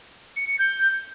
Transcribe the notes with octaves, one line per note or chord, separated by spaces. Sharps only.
C#7
C#7
G6